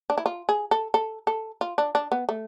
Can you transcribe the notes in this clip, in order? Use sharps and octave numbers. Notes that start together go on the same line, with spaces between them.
D4
E4
F4
G#4
A4
A4
A4
F4
D4
D4
B3
A3